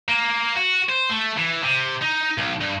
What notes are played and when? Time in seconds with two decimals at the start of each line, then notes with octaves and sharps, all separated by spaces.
0.08 A#3
0.56 F#4
0.89 C5
1.10 A3
1.38 E3
1.64 C3
2.02 D#4
2.38 B1
2.61 G2